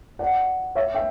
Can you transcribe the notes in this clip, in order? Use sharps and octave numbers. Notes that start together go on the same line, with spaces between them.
D5 F#5
C#5 E5
E5 G5